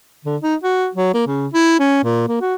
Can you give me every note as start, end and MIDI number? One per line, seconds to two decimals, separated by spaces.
0.25 0.36 50
0.41 0.55 63
0.63 0.88 66
0.95 1.11 54
1.14 1.24 58
1.26 1.47 49
1.53 1.75 64
1.79 2.00 61
2.04 2.27 46
2.28 2.41 58
2.41 2.55 66